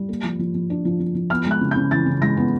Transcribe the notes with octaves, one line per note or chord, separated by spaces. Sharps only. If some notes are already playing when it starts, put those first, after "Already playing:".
Already playing: G3
A#3
F3
F3
F3
D4
F3
F3
F3
B3 F6
G#3 F#6
C#3
C#3 G6
E3 A6
C#3
G#3 A#6
B3